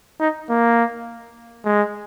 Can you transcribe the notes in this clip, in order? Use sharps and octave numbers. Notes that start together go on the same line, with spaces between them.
D#4
A#3
G#3